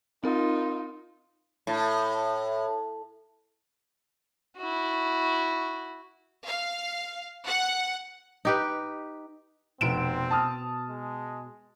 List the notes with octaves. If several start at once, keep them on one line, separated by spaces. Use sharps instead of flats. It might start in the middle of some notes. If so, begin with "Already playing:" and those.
C4 D#4 F4 A#4
A2
E4 F#4
F5
F#5
D#4 G4 B4
F1 B2 C4 D7 E7
A5 D#6 F6
G#3